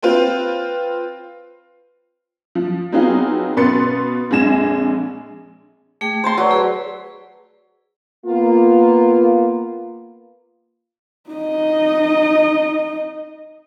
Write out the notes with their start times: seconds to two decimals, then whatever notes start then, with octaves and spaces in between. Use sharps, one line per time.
0.03 C4 F4 B4 C5 G5
2.55 F3
2.92 F#3 B3 C4 D#4 F4 G#4
3.57 C#2 B2 B4 C6 A6 C#7
4.31 A#1 F2 G#3 G#5 A#6 E7
6.01 A3 G#4 G5
6.24 C5 A5 A#5 C6
6.38 F#3 B4 D5 E6
6.51 G#4 B4
8.26 A#3 B3 F4
11.30 D#4 D#5